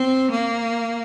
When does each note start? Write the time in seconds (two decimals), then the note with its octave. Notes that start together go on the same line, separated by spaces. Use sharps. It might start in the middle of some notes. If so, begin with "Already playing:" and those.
Already playing: C4
0.31 A#3